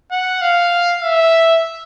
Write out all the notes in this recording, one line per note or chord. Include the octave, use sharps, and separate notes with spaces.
F#5
F5
E5